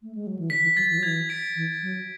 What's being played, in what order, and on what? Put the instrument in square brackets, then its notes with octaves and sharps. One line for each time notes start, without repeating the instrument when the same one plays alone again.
[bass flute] A3
G#3
F#3
E3
[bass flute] D3 [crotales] B6
[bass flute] E3
[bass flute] F#3 [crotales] A6
[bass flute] E3
F#3
[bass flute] E3 [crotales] G#6
[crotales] B6 D7
[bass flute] E3
F#3